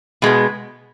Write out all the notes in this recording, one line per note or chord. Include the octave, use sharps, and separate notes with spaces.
B2 G#3 B3